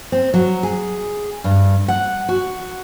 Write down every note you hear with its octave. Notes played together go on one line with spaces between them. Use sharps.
C4
F#3
G#4
G2
F#5
F#4